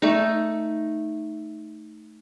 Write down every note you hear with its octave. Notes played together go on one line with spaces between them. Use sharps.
A3 D#4